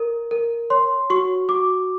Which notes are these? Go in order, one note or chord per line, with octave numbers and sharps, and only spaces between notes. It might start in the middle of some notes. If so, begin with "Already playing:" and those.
Already playing: A#4
A#4
C#5 C6
F#4 C#6
F#4 D6